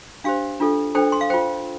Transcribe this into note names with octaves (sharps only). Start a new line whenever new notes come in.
D4 G4 C5 F5
D4 F4 A4
D4 A4 C5 G5
C6
F5
F4 C5 G5